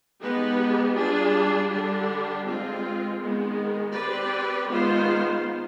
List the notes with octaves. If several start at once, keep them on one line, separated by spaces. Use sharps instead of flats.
G#3 B3 D#4 G4 B4
G3 D4 F4 G#4
D3 G3 D4 G4
G#3 C4 F4
D#3 G#3 B3
C4 G4 B4 D5
D#3 G#3 B3 F4 C5